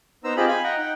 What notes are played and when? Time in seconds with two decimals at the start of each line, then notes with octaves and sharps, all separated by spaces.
0.24 B3 D#4 C5 A#5 E6
0.37 C4 F4 G4 G#4 D#5 B5
0.48 F5 G#5 B5
0.63 D#5 F#5 G5 A#5
0.78 D#4 F#5 G5